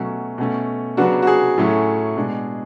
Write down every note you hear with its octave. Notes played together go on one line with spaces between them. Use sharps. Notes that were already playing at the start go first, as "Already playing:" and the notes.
Already playing: B2 F#3 A3 C#4
B2 A3 C#4
C#3 F#3 B3 D4 F#4
F#4
G#4
A2 F#3 A3 C#4
B2 G#3 D4